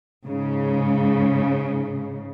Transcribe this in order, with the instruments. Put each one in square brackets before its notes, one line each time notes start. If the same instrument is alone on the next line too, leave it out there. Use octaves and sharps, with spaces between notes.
[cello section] G#2 C#3